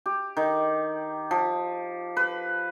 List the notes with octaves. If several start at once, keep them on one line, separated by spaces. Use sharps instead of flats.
G4
D#3
F3
B4